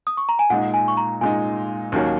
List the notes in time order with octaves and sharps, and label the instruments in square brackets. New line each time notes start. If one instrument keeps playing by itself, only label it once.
[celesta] D#6
C#6
A#5
G#5
[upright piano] A#2 G#3 D#4 [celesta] F#5
[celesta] G#5
C#6
A#5
[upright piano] A#2 G#3 D#4 [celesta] G#5
[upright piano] D#2 D#3 F#3 A#3 C#4